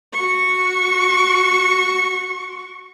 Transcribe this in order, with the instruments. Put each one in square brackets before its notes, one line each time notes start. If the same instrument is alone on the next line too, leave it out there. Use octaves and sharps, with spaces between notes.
[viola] F#4 C#6